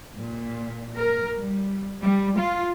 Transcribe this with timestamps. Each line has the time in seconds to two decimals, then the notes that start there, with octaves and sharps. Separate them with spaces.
0.20 A#2
0.99 A#4
1.39 G3
2.03 G3
2.40 F4